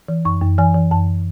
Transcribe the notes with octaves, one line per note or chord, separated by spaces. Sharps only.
E3
F#2 C#6
F#2
E3 G#5
E3
F#2 A5